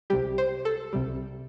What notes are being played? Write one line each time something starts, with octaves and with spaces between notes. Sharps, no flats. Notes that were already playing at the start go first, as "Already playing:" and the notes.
C2 C3 G3 G4
C5
A4
C2 C3 G3